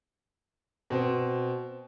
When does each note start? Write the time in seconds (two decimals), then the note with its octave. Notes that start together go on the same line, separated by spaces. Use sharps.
0.90 B2 C4